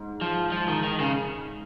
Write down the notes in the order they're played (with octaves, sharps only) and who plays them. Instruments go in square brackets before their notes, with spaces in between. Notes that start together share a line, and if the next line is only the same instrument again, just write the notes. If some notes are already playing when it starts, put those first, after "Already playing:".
Already playing: [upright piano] G#2
[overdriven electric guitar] F3
F3
D#3
D#3
C#3